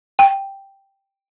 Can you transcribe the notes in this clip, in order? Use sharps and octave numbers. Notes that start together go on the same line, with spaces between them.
G5